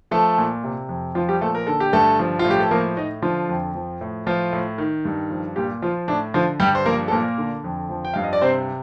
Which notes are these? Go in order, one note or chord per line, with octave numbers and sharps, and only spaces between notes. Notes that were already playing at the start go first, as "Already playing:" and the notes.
F3 A3 A4
A#2
C3
F2
F3 F4
G3 G4
A#2 A3 A4
A#4
D3 A4
G4
G2 A3 A4
F3
F4
A2
G4
A4
F3 A#3 A#4
A2 D#4 D#5
D3 F3 F4
F2
F3
A2
F3 F4
A2
D#3
G2
F3
A#2 G3 G4
F3 F4
A2 D4
D3 F3 F4
G2 G3 G4
C5
F3 A#3 A#4
A4
A#2 A#3 A#4
D3
F2
F3
G5
G2 F5
D#5
D5
C3 C4 C5